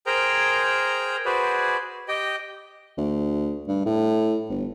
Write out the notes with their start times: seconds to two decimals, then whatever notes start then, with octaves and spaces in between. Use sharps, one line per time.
0.06 G#4 A#4 C5 G5 A#5
1.25 F#4 G#4 B4 C5 D5
2.08 G4 D#5 G5
2.98 D2
3.68 G2
3.86 A2
4.50 G1